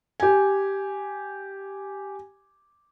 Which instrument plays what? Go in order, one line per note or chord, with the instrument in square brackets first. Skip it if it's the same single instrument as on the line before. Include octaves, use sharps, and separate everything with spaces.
[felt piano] G4 G#5